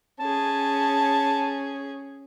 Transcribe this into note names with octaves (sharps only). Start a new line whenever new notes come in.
C#4 G#4 A5